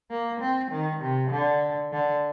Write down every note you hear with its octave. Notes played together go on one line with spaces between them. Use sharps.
A#3
C4
D#3
C3
D3
D3